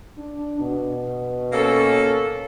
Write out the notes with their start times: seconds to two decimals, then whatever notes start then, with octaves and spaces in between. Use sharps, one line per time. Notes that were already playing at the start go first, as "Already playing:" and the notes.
0.18 D4
0.60 B2
1.53 A#3 C#4 A4